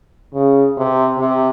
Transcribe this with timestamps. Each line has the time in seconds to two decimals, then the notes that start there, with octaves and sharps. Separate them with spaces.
0.34 C#3
0.77 C3
1.19 C3